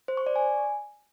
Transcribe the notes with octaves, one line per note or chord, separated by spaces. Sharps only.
C5
C#6
D5
G#5